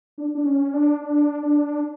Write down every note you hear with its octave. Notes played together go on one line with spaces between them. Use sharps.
D4
D4
C#4
D4
D4
D4